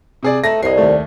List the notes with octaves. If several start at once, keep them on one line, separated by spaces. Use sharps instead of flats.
C3 G#4 D5
A3 C4 D#4 B4 A#6
C2 D3 C#5 D#5 C7
D#2 A3